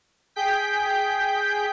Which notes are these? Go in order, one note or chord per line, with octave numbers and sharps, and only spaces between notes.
G#4 G5 G6 B6